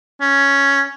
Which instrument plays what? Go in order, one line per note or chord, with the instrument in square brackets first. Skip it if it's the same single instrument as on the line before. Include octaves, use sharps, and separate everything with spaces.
[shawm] C#4